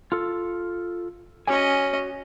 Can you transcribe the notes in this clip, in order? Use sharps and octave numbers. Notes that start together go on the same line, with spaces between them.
F4 A4
C#4 F#4 D#5 G#5